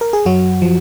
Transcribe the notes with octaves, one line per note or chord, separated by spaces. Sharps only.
A#4
G#4
F#2 F#3 F#4
F3